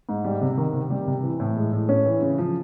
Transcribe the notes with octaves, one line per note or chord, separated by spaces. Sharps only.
G#2
G3
C3
D#3
C3
G3
C3
E3
A2
G#3
A2
C#4
E3
C#3
F3